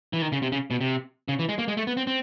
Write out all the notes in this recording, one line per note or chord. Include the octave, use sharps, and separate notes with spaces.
E3
D#3
C#3
C3
C#3
B2
C3
C#3
E3
G#3
A#3
G#3
A3
B3
C4
C4